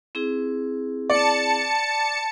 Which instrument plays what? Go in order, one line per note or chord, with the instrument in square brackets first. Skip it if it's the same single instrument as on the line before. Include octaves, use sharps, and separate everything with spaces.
[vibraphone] C4 E4 G#4
[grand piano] D5 [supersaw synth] A5 C#7